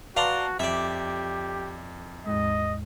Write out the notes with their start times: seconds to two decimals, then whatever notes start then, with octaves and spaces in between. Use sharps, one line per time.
0.16 F#4 B4 D5 F5 A5 A#5 C6
0.59 F2 G4 D5 E5
2.26 D#2 G#2 G#3 D#5